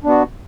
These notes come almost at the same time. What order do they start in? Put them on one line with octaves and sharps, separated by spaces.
D4 B3 F#4